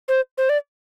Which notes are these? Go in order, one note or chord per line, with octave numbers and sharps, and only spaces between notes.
C5
C5
D5